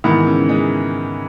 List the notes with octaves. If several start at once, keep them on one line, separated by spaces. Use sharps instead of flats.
G#2 D#3 E3 B3 E4
C#3
G#3